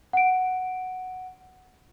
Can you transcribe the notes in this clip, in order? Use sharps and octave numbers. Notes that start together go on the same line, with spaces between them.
F#5 D7